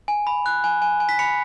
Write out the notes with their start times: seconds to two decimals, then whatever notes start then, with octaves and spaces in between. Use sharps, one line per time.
0.08 G#5
0.27 B5
0.46 F#6
0.64 G#5
0.82 G#5
1.00 G#5
1.09 B6
1.19 B5 C#7